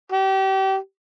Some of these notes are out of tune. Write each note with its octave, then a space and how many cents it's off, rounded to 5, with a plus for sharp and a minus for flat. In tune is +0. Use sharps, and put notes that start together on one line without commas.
G4 -30